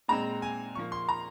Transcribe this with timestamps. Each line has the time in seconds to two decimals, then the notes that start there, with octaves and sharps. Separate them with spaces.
0.08 A#2 G#3 C4 A#5
0.42 G#5
0.75 A#2 F3 A#3 C#6
0.92 C6
1.09 A#5